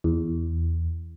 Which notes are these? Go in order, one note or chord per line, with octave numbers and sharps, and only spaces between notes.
E2